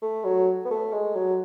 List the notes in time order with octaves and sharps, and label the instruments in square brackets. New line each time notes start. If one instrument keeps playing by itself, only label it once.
[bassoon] A3
F#3
B3
A3
G#3
F#3